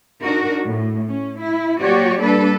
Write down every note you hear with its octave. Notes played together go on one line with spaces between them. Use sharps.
D4 D#4 F#4 A#4
A2
C#4
E4
F#3 A#3 F#4 G4 C#5 D5
G3 A#3 D4 A4 B4